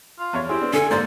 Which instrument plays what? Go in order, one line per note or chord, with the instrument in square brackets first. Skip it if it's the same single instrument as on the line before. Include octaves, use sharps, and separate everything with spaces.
[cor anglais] F4
[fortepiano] E2 C#5
[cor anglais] C4 [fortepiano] E4 G4 G#4
[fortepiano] B3 D4
[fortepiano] D3 [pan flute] A4 [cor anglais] G#5
[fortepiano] G#2 A#3 [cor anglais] C5 [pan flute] D5